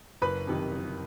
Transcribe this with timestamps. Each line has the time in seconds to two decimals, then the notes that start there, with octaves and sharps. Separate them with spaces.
0.22 F#1 B4 B5
0.47 F2 C3 D#3
0.72 F#1